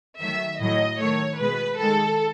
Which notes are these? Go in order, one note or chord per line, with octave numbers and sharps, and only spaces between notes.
D#3 F#3 A3 E5
A2 F#3 A3 D#5
D#3 A3 C#5
B2 G#3 B4
D#3 G#3 A4